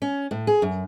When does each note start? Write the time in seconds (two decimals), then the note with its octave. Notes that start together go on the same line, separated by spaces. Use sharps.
0.02 C#4
0.31 A2
0.47 G#4
0.62 F#2